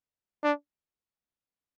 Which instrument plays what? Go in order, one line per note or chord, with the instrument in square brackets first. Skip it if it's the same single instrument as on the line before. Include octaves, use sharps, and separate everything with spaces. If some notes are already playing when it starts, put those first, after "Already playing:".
[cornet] D4